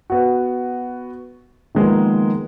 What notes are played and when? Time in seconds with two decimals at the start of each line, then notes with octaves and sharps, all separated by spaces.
0.10 B3 F#4
1.75 D#3 F3 G#3 A#3 B3